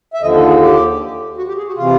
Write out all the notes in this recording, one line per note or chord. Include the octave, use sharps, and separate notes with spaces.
E5
D#2 D3 F3 D#5
A4
G#4
G4
F#4
G4
G#4
F#4
C3 E3 F4